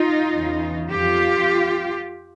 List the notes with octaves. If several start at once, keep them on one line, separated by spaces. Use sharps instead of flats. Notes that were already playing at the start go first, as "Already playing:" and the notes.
Already playing: D#4 F4
E2 C#3 E3
F2 F4 G4